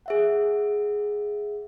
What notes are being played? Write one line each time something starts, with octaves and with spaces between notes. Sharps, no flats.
G#4 E5 F#5